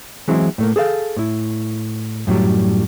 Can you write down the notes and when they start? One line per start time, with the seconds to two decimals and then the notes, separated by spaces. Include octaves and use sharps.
0.28 E3 F#3 G#3 C4 E4
0.58 A2 A3 A#3
0.76 G#4 A4 C5 F5
1.17 A2 E4
2.27 F#2 A2 D#3 F#3 G3